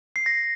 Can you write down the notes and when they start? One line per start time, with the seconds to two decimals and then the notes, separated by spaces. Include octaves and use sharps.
0.16 C7
0.26 A#6